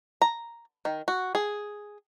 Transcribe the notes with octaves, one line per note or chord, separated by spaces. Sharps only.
A#5
D#3
F#4
G#4